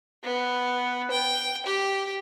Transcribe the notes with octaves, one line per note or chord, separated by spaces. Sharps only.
B3
G5
G4